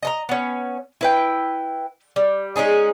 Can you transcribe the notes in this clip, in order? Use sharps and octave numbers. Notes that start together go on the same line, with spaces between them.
D#5 A5 A#5
B3 C#4
E4 B4 G5
G3
G#3 C#4 D#4 G#4